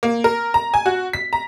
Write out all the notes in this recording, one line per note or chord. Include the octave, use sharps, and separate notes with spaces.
A#3
A#4
A#5
G#5
F#4
B6
A#5